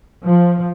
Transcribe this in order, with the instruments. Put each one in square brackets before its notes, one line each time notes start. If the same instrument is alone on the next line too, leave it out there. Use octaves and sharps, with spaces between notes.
[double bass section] F3